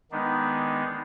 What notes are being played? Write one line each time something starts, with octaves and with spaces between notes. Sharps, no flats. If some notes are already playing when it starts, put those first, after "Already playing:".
D#3 G#3 B3 D4 D#4